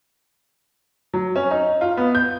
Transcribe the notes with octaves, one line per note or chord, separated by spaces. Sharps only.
F#3
C#4
D#4
F4
B3
G6